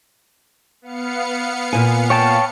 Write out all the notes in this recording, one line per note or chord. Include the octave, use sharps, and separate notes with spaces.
B3 F5 C#7
A#2 G#5
C#5 G5 A5